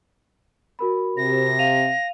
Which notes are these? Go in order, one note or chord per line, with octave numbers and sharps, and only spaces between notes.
F#4 A#4 B5
C3 A#6
F5 D#7 F7